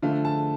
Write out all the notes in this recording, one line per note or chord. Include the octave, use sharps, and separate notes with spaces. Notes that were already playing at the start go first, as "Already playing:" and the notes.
D3 F3 A3 D4 F5
A5